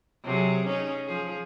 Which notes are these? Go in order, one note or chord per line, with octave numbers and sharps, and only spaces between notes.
C3 F#3 G#4
C#4 D#4 G#4
F3 G#4